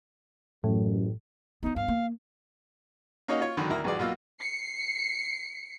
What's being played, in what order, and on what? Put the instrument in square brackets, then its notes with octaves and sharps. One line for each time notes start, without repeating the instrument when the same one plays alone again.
[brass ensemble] A1 F#2 [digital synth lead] A2
[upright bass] B3 F4 [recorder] D#4
[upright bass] G2 [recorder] F5
[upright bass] A#3
[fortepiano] A#3 C#4 D#4 F#4 C#5 D#5
F4 C#5
G#1 D3 D#3 F#3
D2 E4 A#4 A#5
A#1 G2 E3 F#4 G#4 D5
B1 A#3 F4 F#4 E6
[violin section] C7 C#7